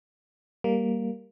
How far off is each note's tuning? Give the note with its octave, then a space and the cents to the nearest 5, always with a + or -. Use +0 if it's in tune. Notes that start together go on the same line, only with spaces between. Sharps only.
G3 +0 A#3 +0